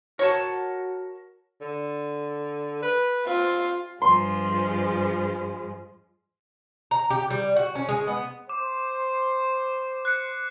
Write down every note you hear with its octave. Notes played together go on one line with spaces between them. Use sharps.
F#4 A#4 C#5 F#5 A5
D3
B4
C4 F4
G2 F3 G#3 C6
A#5
G4
G3
F#4
C#4
G#3
B3
C5 D6
F#6 C7 C#7